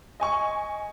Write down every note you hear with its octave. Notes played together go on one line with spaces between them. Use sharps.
D#5 G#5 C#6